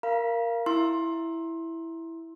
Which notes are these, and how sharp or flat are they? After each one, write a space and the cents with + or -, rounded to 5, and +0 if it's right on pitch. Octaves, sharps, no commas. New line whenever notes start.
A#4 +0 F5 -15 A#5 +40
E4 +0 C6 +20 E6 +0